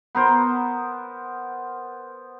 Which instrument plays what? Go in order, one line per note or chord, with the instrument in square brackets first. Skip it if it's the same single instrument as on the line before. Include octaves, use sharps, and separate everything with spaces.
[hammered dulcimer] B3 A#4 C5